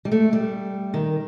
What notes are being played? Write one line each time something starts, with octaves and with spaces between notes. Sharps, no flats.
G3
A3
G3
D#3